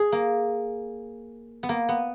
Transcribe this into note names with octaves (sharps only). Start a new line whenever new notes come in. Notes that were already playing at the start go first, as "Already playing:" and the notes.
Already playing: G#4
A#3
B3
A#3
B3